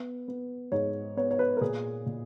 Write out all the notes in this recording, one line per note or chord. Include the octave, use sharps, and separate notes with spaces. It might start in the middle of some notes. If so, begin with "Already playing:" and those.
Already playing: B3
B3
G#2 C#5
B3 C#5
C#5
B4
A#4
A#2 G#4
A#2